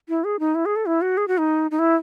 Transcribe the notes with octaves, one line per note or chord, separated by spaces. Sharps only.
E4
G#4
D#4
E4
G#4
A4
E4
F#4
G#4
F#4
D#4
D#4
E4